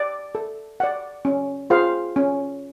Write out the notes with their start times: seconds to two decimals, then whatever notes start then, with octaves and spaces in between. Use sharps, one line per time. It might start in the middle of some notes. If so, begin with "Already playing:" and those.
Already playing: D5
0.35 A4
0.80 D5 F#5
1.25 C#4
1.70 F4 G#4 C5 F5
2.16 C#4